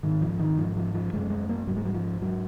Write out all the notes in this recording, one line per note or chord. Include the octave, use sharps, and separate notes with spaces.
G#2 D#3
F3
D#3
G#2 F3
F3
F3
F#2 C#3 G#3
G#3
A#3
G#2 F#3
G#3
F#3
F3
G#2 F#3